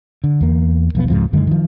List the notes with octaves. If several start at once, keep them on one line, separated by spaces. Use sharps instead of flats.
D3
E2 A#3
E1 B1 F3 B3
C#2 G#2 F3 C4
F#2 D3 D#3 G#3
D#3 F3